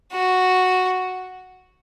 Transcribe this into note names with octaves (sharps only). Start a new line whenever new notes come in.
F#4